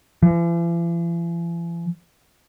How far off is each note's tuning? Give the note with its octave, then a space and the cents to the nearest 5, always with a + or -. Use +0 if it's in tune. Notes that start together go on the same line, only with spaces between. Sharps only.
E3 +45